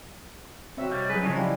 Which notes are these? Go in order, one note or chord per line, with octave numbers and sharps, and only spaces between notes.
C4 F#4 C#5 D#5 E5
C3 G3
F#3 G3 E4 F#4 G#4 B4
C#3 F3 G#3 C#4 C#5 D#5
E4 G4 D5 D#5 G5